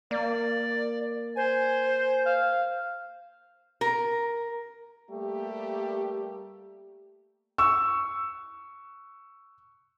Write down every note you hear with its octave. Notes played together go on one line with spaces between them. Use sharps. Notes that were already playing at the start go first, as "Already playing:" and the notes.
A#3 D5
C5 G#5
F5
A#4
G3 A3 A#3 G4
C#6 E6